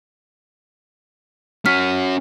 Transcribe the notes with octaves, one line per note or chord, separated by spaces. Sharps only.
C#4 F#4 F6 B6